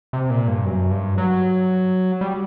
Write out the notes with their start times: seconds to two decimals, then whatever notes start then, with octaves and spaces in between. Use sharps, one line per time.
0.13 C3
0.30 A#2
0.48 G2
0.65 F#2
0.91 G2
1.18 F#3
2.21 G3